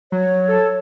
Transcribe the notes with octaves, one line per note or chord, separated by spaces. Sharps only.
F#3 C#5
A4